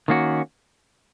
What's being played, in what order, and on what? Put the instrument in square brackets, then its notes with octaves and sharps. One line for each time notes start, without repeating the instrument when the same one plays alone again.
[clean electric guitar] D#3 A#3 C#4 F#4